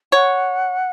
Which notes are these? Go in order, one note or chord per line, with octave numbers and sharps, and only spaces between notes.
C#5 F#5